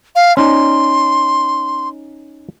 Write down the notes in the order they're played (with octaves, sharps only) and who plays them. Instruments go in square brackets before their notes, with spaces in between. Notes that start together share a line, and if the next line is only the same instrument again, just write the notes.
[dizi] F5
[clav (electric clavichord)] C#4 D#4 [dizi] C6